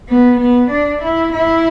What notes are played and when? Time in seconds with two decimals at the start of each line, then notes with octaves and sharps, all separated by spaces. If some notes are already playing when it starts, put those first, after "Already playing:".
0.09 B3
0.40 B3
0.70 D4
1.02 E4
1.33 E4